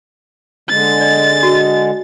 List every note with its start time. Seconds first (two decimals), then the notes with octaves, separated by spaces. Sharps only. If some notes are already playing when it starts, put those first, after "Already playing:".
0.70 D3 G#3 A6
1.01 D5
1.43 F#4